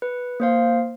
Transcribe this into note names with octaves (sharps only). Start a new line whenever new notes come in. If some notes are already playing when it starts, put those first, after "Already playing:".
B4
A#3 C5 F5